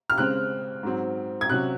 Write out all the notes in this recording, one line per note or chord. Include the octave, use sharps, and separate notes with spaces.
F6
C#3 G#3 C4 F#6
G#2 F#3 C4
G#6
C3 F#3 C#4 F#6